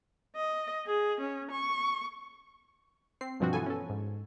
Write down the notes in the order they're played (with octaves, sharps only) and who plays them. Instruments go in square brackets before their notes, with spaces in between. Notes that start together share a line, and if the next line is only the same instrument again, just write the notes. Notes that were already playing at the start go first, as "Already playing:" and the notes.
[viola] D#5
G#4
C#4
C#6
[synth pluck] C4 C7
G2 B2 F3 C4 F#4
E3 B3 A4 G#5
C#4 A4
G#2